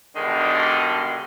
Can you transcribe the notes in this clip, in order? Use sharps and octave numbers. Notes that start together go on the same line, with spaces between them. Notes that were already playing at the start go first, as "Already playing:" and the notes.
G2 B2 D3 D#3 G#3